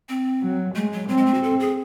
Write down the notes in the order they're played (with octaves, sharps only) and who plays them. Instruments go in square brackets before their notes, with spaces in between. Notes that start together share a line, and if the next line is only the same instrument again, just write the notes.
[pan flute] C4
[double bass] F#3
[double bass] G#3 [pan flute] A3
[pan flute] F#3
[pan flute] F#3 [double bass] C4
[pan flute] G#3
A3
F#4
A4
G#4